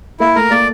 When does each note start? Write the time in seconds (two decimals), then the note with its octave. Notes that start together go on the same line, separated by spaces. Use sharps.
0.20 A#3 E4
0.36 A3 A#4
0.51 A#3 D5